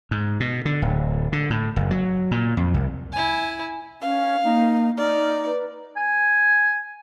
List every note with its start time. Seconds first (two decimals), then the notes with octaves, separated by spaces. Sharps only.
0.11 G#2
0.40 B2
0.65 D3
0.82 D1
1.32 D3
1.50 A2
1.76 F#1
1.91 F#3
2.31 A#2
2.57 F2
2.74 C2
3.12 E4 G#5
4.02 C#4 F5
4.44 A#3 D#4
4.97 D#4 D5 F6
5.45 B4
5.97 G#5